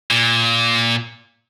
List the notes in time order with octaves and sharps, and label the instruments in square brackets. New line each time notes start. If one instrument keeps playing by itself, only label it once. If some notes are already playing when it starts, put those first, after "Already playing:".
[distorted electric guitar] A#2